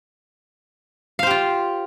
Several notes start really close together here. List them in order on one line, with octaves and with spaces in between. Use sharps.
F5 C5 G4 F4